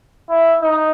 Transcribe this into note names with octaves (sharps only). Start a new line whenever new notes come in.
E4
D#4